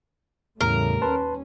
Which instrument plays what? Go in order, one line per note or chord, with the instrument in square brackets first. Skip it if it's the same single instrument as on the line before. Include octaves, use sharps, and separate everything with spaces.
[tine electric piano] E2 A2 [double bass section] C#3 G3 A3 [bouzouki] A#4
[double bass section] D#2 C#4 [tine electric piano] B4 A5 C6